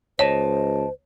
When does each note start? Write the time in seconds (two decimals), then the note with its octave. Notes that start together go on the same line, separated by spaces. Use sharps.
0.19 C#2 C5 C#5 D#5 A5